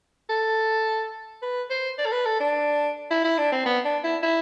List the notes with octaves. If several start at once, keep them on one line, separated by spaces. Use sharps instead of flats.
A4
B4
C5
D5
A4
B4
A4
D4
E4
E4
D4
C4
B3
D4
E4
E4